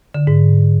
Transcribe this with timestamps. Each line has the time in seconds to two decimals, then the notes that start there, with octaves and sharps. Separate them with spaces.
0.14 D3
0.27 G#2